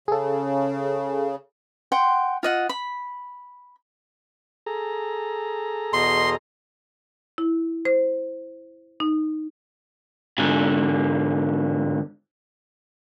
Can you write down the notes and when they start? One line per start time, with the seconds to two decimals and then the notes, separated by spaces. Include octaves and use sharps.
0.08 C#3 G#4 A4
1.92 F#5 G5 C6
2.43 F4 D#5 F#5
2.69 B5
4.66 G#4 A4 A#5
5.93 E2 B2 D#5 C6
7.38 E4
7.85 C5
9.00 D#4
10.38 G#2 D3